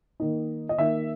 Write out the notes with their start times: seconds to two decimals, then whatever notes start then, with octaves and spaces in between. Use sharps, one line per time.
0.20 D#3 A#3 D#4
0.69 D#5
0.78 D#3 A#3 D#4 E5